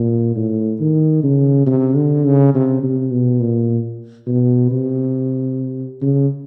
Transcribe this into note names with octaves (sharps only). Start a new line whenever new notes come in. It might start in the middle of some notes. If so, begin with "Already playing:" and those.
Already playing: A#2
A2
D#3
C#3
C3
D3
C#3
C3
C3
B2
A#2
B2
C3
C#3